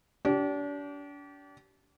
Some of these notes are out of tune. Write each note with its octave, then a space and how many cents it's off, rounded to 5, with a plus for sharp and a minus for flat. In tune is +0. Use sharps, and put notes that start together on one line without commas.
D4 -35 G4 -30